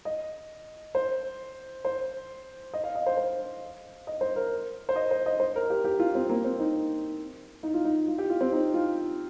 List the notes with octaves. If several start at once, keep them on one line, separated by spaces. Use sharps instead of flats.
D#5
C5
C5
D#5
F5
D#5
C5
C5
D#5
C5
A#4
C5
D#5
C5
D#5
C5
A#4
G4
G4
F4
C4
A#3
C4
D#4
D#4
F4
D#4
F4
G4
F4
C4
D#4
F4